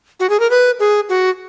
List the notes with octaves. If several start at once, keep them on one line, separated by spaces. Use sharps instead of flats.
F#4
G#4
A#4
B4
G#4
F#4